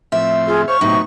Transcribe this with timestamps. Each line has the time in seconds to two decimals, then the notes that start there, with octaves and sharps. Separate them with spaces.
0.12 A2 F3 C4 E5
0.47 F4 G#4
0.68 C5 C#5 F5 C#6
0.81 A2 C3 F#3 B3 D#4